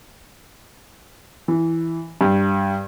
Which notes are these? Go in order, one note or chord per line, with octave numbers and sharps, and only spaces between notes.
E3
G2